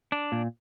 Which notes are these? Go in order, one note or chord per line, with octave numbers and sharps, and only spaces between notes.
D4
A#2